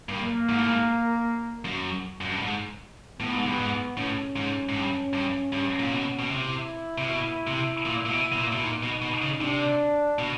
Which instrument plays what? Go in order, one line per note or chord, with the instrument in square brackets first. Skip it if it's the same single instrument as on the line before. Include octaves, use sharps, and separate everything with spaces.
[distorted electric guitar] G2 [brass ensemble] A#3
[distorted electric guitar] G#2
A2
G#2
F#2
F#2
G2
G#2
[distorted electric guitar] A2 [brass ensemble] B3
[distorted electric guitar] G#2
G2
G#2
[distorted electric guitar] A2 [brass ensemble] C#4
[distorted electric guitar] G#2
G#2
G2
G2
G2
A#2
B2
B2
[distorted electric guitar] C3 [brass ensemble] E4
[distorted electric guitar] C3
B2
C3
A#2
A#2
B2
B2
A#2
B2
[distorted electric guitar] A#2 [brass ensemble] D#4
[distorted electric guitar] B2
B2
C#3
[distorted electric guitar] C3 [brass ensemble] D4
[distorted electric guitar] B2